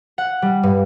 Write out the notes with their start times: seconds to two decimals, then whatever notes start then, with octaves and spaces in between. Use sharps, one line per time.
0.18 F#5
0.42 G3
0.63 G2